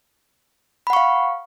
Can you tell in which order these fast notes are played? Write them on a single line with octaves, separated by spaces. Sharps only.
B5 F#5 C#6 F5